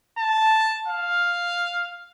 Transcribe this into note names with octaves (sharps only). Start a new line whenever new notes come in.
A5
F5